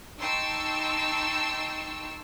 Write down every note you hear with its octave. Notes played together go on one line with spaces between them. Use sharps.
D#4 G5 A5 C6 C#6 E6